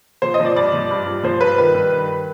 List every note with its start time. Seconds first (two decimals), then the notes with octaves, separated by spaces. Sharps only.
0.22 F3 C5
0.34 D#5
0.40 F3
0.45 D5
0.56 G2 D5
0.73 F3
0.91 G2
1.07 G2
1.23 F3 C5
1.40 G2 B4
1.57 D#3 B4
1.74 G2
1.92 D#3